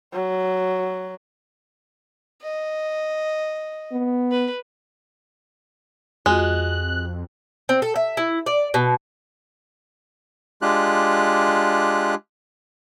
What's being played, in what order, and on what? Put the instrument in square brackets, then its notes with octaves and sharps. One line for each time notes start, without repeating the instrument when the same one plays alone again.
[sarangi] F#3
[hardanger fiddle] D#5
[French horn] B3
[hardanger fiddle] B4
[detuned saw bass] F2 [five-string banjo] G#3 [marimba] F4 F#4 D#5 [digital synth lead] F#6
[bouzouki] C4
A4
E5
E4
D5
B2
[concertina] G#3 D4 F4 G4 F#6